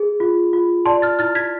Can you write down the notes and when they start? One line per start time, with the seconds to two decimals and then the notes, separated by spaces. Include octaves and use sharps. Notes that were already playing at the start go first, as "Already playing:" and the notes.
Already playing: G#4
0.20 F4
0.53 F4
0.86 D5 A5 C6
1.02 F6 A6
1.19 E4 F6 A6
1.35 G#6 B6